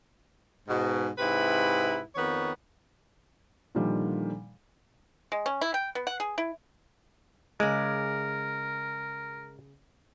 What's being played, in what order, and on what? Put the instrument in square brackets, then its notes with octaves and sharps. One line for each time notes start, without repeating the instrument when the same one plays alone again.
[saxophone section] G#2 B2
G#2 C3 E4 B4
F2 D#3 B3 C#5
[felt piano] A#2 D3 D#3 F3 G3
[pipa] G#3
C#4
E4
G5
B3
F#5
G#4
E4
[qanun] C#3 D5 [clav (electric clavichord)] G#3 [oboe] A#4